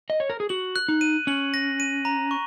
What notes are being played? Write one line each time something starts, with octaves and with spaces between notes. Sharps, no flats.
D#5
C#5
A#4
G#4
F#4 F#7
F#6
D#4
D#7
C#4 F#7
A#6
D#7
A#5
C#6